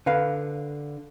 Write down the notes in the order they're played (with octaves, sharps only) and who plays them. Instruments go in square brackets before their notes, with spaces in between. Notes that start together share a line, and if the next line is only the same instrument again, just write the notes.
[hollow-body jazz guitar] D3 B4 F5